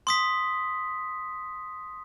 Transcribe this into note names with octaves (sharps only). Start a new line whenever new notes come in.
C6 D#6 B6